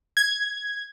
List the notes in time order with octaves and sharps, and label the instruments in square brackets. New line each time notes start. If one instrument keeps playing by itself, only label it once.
[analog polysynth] G#6